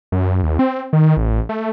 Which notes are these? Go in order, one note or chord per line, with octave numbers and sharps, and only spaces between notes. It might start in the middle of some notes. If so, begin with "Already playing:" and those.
F#2
D#2
C4
D#3
A1
A3